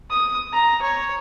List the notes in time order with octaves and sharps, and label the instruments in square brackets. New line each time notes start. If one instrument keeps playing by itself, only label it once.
[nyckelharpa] D#6
A#5
C#5